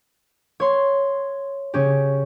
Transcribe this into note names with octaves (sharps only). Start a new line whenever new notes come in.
C#5 C6
C#3 C#4 G4